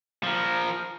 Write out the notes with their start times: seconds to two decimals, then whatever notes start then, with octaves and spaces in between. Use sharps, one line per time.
0.23 F3 A#4